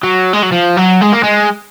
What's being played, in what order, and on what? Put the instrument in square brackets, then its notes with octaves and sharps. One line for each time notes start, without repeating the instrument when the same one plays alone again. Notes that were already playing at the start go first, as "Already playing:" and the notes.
[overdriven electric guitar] F#3
G#3
F#3
F3
F#3
G#3
A#3
G#3